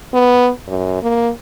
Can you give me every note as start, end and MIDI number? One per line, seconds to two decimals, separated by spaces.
0.13 0.50 59
0.68 1.00 42
1.03 1.30 58